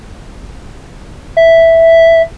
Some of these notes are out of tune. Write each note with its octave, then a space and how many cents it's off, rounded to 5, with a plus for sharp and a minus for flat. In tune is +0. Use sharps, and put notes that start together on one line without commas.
E5 +0